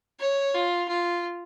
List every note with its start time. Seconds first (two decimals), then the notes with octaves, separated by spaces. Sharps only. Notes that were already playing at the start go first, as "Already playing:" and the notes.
0.19 C#5
0.54 F4
0.88 F4